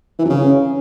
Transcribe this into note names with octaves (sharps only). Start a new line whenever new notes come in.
E3
F#2
C#3